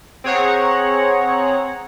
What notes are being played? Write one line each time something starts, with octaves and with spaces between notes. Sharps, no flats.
C4 G#4 C#5 F#5 A#5